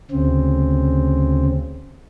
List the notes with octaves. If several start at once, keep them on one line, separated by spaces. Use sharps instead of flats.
D2 C#3 C4